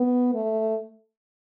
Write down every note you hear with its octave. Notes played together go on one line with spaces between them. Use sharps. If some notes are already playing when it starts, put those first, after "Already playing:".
Already playing: B3
A3